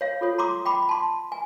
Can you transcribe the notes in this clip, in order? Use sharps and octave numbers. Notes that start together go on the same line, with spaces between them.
C#5 F5
F4 A4 C#5
A#5 C6 D6 D#6
G5 B5 D6
A5 C6
G#5